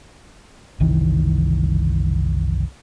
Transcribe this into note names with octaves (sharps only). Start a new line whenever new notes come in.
F#1 C2 D#3 E3